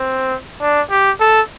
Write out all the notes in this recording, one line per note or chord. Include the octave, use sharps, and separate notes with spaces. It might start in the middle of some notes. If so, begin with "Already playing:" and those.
Already playing: C4
D4
G4
A4